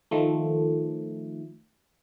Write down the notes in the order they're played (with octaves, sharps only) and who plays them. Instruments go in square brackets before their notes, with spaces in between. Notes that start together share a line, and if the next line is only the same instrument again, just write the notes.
[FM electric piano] D#3 F3 A3